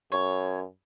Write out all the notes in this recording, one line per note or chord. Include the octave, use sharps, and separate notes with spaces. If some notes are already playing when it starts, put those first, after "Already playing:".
F#2 C#5